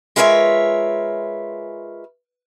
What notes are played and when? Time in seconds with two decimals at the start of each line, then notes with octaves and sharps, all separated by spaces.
0.16 G#3 F4 A#4 B4 C#5 E5